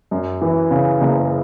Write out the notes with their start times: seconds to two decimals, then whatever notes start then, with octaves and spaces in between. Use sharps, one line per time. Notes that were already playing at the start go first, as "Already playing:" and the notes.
0.11 F#2
0.41 E3
0.71 C#3
1.01 F#1